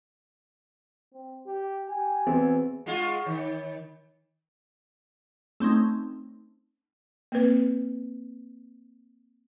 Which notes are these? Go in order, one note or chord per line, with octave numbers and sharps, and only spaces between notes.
C4
G4
G4 G#5
E2 C4 F#4
G#3 F4 F#5 C#6
D#3 C#5
A3 C4 C#4 D#4
A#3 C4 B4